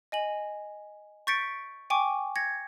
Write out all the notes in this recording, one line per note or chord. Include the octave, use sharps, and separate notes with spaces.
D#5 G#5 F#7
C#6 G6 A6 B6 C#7 D7
G5 G#5 C#6 D6
G#6 A#6 C#7